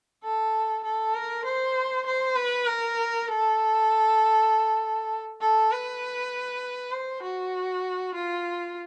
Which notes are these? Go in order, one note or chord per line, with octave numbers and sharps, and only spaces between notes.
A4
A4
A#4
C5
C5
B4
A#4
A4
A4
B4
C5
F#4
F4